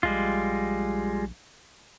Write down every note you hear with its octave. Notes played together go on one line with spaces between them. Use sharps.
A#1 G3 G#3 F4